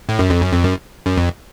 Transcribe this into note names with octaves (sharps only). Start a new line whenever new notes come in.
A2
F#2
F2
F#2
F2
F#2
F#2
F2